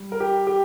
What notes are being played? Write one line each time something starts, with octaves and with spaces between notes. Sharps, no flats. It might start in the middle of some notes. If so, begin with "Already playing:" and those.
Already playing: G3
A#4
G4
G4